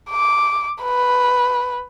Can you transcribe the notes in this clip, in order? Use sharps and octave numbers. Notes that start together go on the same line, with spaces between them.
D6
B4